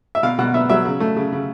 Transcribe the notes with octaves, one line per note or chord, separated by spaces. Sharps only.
E5
B2 F5
B2 F#5
B3 E5
F#3 E5
C#3
A3
C#3
C#3